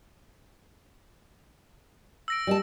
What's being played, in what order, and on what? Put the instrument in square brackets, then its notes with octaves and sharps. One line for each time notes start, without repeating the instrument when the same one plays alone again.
[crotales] E6 A#6 D7
[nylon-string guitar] G3 D#5 A5